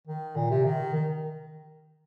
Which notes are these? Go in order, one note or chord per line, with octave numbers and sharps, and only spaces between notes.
D#3
A#2
C3
D#3
D#3